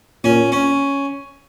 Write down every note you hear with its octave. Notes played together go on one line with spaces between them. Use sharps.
A#2 C#4
C#4